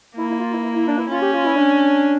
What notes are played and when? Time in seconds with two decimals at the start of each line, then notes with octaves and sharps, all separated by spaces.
0.16 A#3 E4
0.29 E4
0.39 F4
0.52 E4
0.63 E4
0.75 E4
0.87 D4
0.97 E4
1.09 C#4 F4
1.21 G4
1.33 F4
1.45 E4
1.56 D4